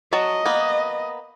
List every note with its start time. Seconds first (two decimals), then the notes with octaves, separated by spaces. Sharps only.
0.13 F#3 F#4 D#5 A5
0.46 A#3 B3